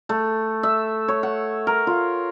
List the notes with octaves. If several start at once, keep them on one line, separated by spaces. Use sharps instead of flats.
A3
E5
C#5
F#5
A#4
F4